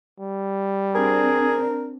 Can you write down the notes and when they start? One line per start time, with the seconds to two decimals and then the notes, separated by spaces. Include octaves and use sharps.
0.19 G3
0.95 C4 D4 G#4 A#4